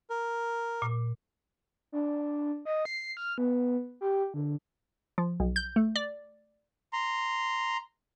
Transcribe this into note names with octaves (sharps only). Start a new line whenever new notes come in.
A#4
A#2
D4
D#5
C7
F6
B3
G4
D3
F3
B1
G6
A3
D5
A#5 C6